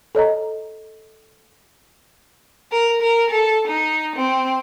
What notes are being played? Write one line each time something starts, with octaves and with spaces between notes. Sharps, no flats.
A4 C#5 D#5 A#5
A#4
A#4
A4
D#4
C4